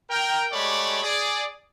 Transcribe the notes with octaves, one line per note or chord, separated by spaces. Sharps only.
A#4 G5
G#3 A3 G4 C#5 D5 B5
G#4 D5